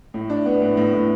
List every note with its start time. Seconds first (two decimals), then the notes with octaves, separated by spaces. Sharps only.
0.14 A2
0.30 D4
0.45 B3
0.62 A2
0.77 A2
0.93 A2